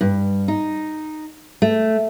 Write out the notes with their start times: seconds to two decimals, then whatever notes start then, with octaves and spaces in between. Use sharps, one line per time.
0.01 G2
0.48 D#4
1.62 A3